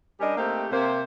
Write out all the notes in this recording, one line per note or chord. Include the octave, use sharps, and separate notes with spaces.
G3 C#4 D4 G4 A#4 D#5
A3 A#3 C4 D#4 G4
C3 A#3 C5